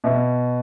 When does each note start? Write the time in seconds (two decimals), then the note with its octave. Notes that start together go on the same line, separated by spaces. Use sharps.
0.04 B2 E5